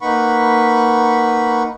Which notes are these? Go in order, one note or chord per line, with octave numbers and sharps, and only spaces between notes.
A#3 D#4 B4 F#5 B5 C#6